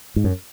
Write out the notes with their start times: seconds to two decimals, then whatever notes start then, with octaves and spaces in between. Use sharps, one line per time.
0.16 G#2
0.24 F#2